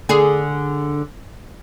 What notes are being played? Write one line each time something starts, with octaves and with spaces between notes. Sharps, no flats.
D3 G#4